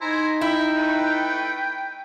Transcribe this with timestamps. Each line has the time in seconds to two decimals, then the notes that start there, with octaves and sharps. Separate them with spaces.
0.01 D#4 E4 C5 G#5 A#5
0.41 E4 E5 G5
0.77 A3 A4 B4